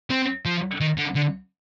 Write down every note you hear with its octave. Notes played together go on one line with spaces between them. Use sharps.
C4
F3
D#3
D3
D3